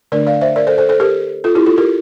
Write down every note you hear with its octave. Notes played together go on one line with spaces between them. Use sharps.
D3 A3 D4 A#4 D5
D5 F5
C5 E5
A#4 D5
A4 C5
A4 C5
A4 C5
G4 A#4
F4 A4
E4 G4
F4 A4
G4 A#4